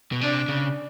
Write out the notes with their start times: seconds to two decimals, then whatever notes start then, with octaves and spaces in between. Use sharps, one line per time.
0.12 B2
0.21 C3 D4
0.48 C#3